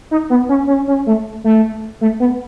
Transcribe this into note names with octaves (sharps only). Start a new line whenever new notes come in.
D#4
B3
C#4
C#4
C#4
A3
A3
A3
B3